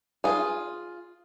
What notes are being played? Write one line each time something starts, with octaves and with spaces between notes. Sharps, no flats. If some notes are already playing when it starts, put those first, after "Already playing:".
F4 G#4